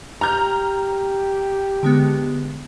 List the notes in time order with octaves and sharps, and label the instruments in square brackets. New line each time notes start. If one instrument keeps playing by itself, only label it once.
[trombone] G4 [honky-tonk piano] A#5 F6 G6
[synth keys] D3 G#3 B3